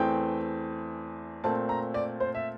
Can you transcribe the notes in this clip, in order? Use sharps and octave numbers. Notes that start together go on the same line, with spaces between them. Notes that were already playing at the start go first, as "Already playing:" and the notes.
Already playing: E2 E3 A3 C4 G5
A#2 A3 C4 A5
A#5
D5
C5
E5